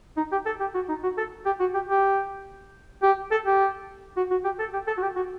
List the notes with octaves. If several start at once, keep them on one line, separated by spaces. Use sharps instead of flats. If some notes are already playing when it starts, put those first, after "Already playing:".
D#4
G4
A4
G4
F#4
D#4
F#4
A4
G4
F#4
G4
G4
G4
A4
G4
F#4
F#4
G4
A4
G4
A4
F#4
G4
F#4